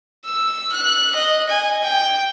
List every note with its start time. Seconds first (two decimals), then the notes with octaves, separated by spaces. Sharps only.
0.25 E6
0.72 F#6
1.14 D#5
1.49 G#5
1.82 G5